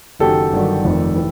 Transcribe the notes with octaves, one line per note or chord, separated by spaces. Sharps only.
F#1 F#2 D#3 F#3 G4 A4
G1 G2 D#3 F#3
F1 F2 C3 D#3
E3